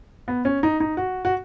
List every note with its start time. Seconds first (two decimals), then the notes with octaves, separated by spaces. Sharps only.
0.28 B3
0.45 C#4
0.63 D#4
0.80 D#4
0.97 F#4
1.25 F#4